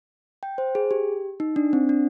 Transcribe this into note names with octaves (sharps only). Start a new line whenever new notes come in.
G5
C5
G#4
G4
D#4
D4
C4
D4